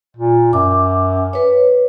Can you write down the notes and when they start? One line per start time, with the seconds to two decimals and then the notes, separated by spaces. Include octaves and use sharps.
0.17 A#2
0.53 F#2 D6
1.33 B4 C#5